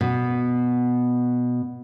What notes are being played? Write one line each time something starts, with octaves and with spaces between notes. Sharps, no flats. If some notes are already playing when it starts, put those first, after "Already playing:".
B2